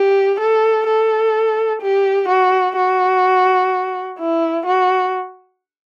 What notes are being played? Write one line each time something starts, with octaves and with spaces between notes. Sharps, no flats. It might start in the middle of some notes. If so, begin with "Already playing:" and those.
Already playing: G4
A4
A4
G4
F#4
F#4
E4
F#4